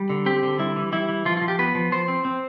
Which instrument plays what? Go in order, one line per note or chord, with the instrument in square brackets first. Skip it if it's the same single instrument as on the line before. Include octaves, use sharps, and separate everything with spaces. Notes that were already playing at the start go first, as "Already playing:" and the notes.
Already playing: [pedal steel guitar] G3
D3
C4 G4
D3
G3 E4
E3
G3 E4
E3
F3 F4
F3 F4
G4
B3 B4
F3
F3 C5
C4
C4